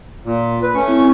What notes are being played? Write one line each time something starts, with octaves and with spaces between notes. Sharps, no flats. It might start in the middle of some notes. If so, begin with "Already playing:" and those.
A#2
B4
A3 C#4 C#6
C4 E4